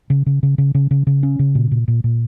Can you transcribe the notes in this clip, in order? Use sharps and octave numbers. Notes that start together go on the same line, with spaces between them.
C#3
C#3
C#3
C#3
C#3
C#3
C#3
C#4
C#3
A#2
A#2
A#2
A#2